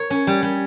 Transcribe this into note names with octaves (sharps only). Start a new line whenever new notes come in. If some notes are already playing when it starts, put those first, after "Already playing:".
Already playing: C#5
C#4
G3
G3